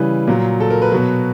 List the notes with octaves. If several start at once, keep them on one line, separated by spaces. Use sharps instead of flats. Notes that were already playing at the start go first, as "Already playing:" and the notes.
Already playing: C#3 E3 G3 B4
A#2 F#3
A4
A#4
B4
B2 F#3 B4